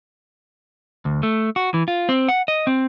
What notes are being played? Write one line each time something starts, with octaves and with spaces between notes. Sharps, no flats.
D2
A3
F#4
E3
F4
C4
F#5
D#5
C4